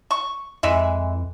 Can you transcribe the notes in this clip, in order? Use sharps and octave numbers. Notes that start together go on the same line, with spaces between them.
C#6
F2 E3 G#3 E5